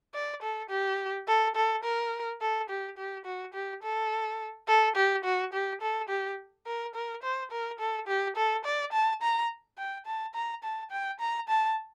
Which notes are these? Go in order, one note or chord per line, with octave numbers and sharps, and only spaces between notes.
D5
A4
G4
A4
A4
A#4
A4
G4
G4
F#4
G4
A4
A4
G4
F#4
G4
A4
G4
A#4
A#4
C5
A#4
A4
G4
A4
D5
A5
A#5
G5
A5
A#5
A5
G5
A#5
A5